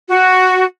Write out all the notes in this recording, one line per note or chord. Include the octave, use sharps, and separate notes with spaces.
F#4